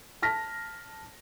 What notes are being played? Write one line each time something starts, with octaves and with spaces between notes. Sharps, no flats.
A5 F6 A#6 B6